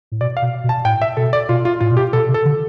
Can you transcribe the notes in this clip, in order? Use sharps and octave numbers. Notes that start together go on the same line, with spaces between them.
A2
B2 D5
F5
B2
B2
A5
A2 G5
E5
B2 A4
D5
B2 F4
F4
A2 F4
B2
G4
B2 A4
C3
A4
D3